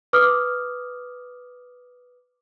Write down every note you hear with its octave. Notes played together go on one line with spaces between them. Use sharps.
B4 D6 D#6 F6